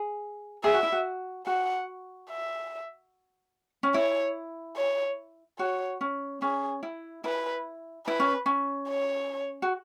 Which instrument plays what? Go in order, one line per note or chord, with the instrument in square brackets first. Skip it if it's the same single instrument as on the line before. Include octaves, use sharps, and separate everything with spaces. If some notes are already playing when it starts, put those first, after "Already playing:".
Already playing: [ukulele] G#4
[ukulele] G#4 [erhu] E5
[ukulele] F#4
E4
F#4
[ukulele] F#4 [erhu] F#5
[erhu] E5
[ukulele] C#4
[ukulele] E4 [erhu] C#5
[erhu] C#5
[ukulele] F#4 [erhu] C#5
[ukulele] C#4
[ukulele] C#4 [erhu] G#4
[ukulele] E4
[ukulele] E4 [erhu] B4
[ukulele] E4 [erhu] B4
[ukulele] C#4
C#4
[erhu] C#5
[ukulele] F#4